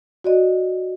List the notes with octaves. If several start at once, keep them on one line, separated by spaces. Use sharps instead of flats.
F#4 D5 D#5